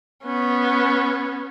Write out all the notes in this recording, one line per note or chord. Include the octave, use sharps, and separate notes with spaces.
B3 C#4